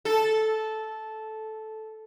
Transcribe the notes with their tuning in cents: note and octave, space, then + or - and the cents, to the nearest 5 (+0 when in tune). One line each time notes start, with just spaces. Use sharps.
A4 -10